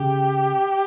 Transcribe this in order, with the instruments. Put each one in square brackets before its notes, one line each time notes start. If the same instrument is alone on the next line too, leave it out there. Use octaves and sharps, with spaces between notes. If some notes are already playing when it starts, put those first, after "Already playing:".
Already playing: [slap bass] C#3 [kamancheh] G4